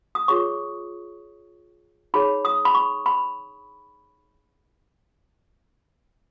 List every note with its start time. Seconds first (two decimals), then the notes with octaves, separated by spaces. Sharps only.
0.15 D#6
0.28 F4 G#4 C#5 C#6
2.14 D#4 G#4 C#5 B5
2.45 D#6
2.65 B5
2.75 C#6
3.06 B5